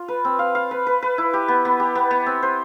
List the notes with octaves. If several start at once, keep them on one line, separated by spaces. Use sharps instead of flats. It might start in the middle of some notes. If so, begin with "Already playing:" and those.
Already playing: F4
B4
C4
F5
F5
B4
B4
B4
E4
G4
B3
B3
G4
B3
B3
C4
C5